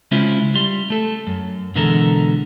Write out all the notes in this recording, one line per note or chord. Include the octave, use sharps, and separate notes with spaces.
C#3 G#3 C#4 E4 F4 C5
G3 C6
A3 A4
F#2
B2 D3 E3 G#3 A4 A#4